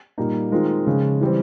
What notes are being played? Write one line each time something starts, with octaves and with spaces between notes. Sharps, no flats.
A#2 G3 A#3 D#4
D#3 G#3 C4 F4 A#4
C#3 F3 G#3
E3 G3 C4